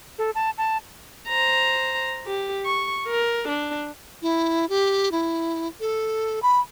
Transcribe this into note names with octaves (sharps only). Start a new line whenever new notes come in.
A4
A5
A5
C5 A#5
G4
C#6
A#4
D4
E4
G4
E4
A4
B5